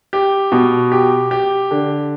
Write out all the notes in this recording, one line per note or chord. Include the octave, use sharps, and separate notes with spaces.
G4
B2
G4
G4
D3